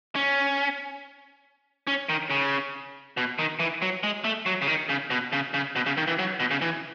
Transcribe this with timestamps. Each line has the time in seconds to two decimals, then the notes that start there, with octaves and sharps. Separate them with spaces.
0.16 C#4
1.87 C#4
2.09 D#3
2.31 C#3
3.17 B2
3.39 D#3
3.60 E3
3.82 F#3
4.03 G#3
4.24 A3
4.46 F#3
4.62 C#3
4.67 D#3
4.89 C#3
5.10 B2
5.33 C#3
5.54 C#3
5.76 B2
5.86 C#3
5.97 D#3
6.08 E3
6.19 F#3
6.40 B2
6.51 C#3
6.61 E3